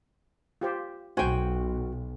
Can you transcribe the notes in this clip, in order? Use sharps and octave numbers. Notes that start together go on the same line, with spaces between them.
F4 G4 C5
B1 F#4 C5 G5 G#5